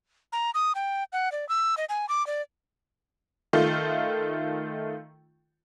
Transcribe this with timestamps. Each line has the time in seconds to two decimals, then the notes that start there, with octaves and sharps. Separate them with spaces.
0.32 A#5
0.54 D#6
0.75 G5
1.13 F#5
1.32 D5
1.49 E6
1.77 D#5
1.89 G#5
2.09 D6
2.27 D5
3.53 D#3 A3 F4